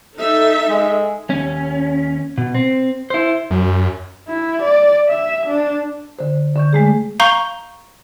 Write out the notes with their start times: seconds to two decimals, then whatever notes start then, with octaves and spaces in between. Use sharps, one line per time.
0.17 D#4 A4 E5
0.69 G#3
1.30 D#2 C#4
2.38 B2
2.55 C4
3.10 E4 C5
3.51 F#2
4.28 E4
4.62 D5
5.08 E5
5.47 D4
6.19 D3 C5
6.56 D3 C#6 G6
6.73 G#3 A3 G#4
7.20 F5 A#5 C#6 G6 G7